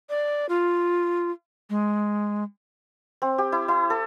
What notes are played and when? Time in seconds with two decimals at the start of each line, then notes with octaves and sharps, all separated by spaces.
0.10 D5
0.49 F4
1.70 G#3
3.22 C4
3.38 G4
3.52 E4
3.68 E4
3.90 A4